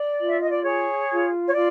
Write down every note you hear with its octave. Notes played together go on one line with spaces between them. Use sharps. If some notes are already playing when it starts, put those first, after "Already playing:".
Already playing: D5
F4
E5
D#5
D5
G#4 C#5
F4
C#5
F4 D5